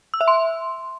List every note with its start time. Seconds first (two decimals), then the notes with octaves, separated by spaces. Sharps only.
0.14 E6
0.21 E5
0.28 C6